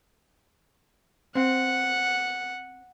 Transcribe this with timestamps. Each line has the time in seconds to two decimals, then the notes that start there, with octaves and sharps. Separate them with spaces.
1.35 C4 F#5